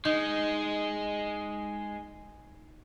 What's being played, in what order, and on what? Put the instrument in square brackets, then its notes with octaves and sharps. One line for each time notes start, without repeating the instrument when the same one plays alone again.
[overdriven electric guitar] G#3 [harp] D#4